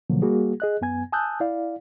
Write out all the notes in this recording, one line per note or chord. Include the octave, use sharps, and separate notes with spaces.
B2 D3 F3 F#3 A#3
G3 A#3 F#4 G#4
G#4 D#5 F#6
F#2 B3 G#5 G#6
G#5 A5 D#6 E6 F#6 G6
E4 D5 F5